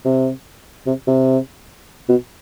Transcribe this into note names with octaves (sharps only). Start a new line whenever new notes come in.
C3
C3
C3
B2